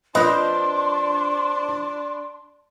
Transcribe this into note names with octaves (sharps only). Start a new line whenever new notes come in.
F3 C4 D4 B4 C5 D#5 C6